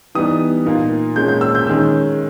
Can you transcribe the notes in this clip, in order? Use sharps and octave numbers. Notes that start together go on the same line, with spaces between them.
E3 G3 B3 D#4 D#6
A#2 A#3 D#4
A#2 G#3 C#4 G6
G6
E6
G6
D#3 G#3 C#4 E6